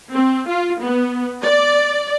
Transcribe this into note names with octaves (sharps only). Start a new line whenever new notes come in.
C4
F4
B3
D5